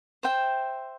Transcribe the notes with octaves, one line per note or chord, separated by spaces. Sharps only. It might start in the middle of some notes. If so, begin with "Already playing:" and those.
C5 E5 G5